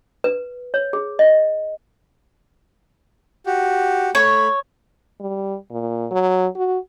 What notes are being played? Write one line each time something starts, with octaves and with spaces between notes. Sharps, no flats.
B4
C#5
G#4
D#5
F#4 G4
A3 C#5 B5
G3
A#2
F#3
F#4